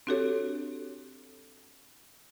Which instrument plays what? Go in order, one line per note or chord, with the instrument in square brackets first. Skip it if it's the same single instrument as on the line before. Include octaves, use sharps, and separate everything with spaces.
[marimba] C4 D4 F#4 G4 A4 C#5